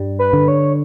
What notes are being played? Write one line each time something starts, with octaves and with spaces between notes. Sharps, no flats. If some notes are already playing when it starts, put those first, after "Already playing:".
Already playing: G2 G3
B4
D3
C#5